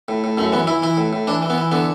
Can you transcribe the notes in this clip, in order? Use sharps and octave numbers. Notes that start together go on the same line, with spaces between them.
A2
A2
F#2 A3
E3 B3
E3 E4
E3 E4
A2
A2
E3 D4
E3
B3
E3
D3 B3